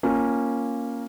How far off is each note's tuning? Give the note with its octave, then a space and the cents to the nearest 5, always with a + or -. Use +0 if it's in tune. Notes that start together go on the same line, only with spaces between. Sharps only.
A#3 +0 C#4 -10 F4 +0